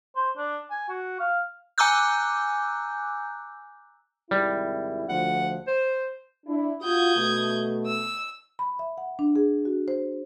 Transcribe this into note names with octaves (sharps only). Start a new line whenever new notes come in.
C5
D4
G#5
F#4
F5
G#5 A#5 D6 E6 F#6 G6
G#1 C3 G3 E4
D2 F3 F#5
C5
D4 E4
F4 F#4 D#6 G6 G#6
B2 A3
E6
B5
E5
F#5
D4
G#4
F#4
C5